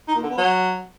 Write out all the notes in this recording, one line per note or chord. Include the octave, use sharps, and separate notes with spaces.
D#4
A#2
D3
B3
F#3